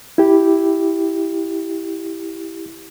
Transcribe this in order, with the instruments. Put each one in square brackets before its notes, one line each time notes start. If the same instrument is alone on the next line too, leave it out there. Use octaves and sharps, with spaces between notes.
[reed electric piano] E4 G4